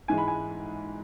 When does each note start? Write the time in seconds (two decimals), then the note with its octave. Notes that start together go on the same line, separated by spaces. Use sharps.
0.08 G#2 E3 G#3 G#5
0.18 B5
0.28 G#5